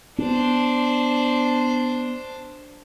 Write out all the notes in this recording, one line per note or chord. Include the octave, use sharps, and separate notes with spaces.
B3 D4 C5